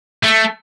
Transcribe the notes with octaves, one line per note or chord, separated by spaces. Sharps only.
A3